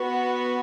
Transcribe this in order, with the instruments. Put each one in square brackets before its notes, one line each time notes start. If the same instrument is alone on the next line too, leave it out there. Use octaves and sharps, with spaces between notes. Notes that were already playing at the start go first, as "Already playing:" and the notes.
Already playing: [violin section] B3 F#4